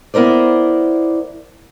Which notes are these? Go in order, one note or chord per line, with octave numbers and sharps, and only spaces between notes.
B3 E4 A#4 C5 D5